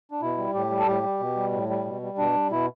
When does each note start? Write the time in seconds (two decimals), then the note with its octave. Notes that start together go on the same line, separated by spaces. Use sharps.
0.11 D4
0.22 B2 E4
0.38 G3
0.54 A2 G4
0.71 G3
0.79 A4
0.87 A2 G4
1.03 G3
1.20 B2
1.36 G3
1.52 A2
1.69 G3
1.85 B2
2.02 G3
2.18 B2 D4
2.35 G3
2.51 B2 E4